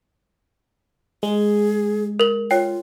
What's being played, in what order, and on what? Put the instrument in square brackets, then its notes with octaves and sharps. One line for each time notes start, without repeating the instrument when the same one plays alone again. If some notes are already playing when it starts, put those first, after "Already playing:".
[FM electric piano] G#3 [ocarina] G#4
[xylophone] A#4 F#7
[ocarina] F4 [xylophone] C#5 G5